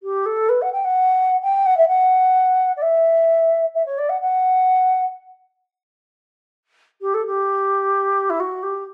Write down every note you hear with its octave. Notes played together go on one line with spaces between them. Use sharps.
G4
A4
B4
F#5
G5
F#5
G5
F#5
E5
F#5
D5
E5
E5
C#5
D5
F#5
F#5
G4
A4
G4
E4
F#4
G4